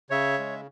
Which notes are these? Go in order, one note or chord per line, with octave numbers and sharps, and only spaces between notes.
C#3 C#5 E5
G#3